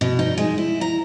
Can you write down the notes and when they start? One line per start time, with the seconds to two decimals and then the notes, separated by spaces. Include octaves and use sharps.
0.01 B2
0.19 D#4
0.38 G#3
0.58 E4
0.81 A#5